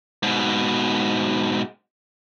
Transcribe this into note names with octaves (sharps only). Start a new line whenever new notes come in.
G#2 B2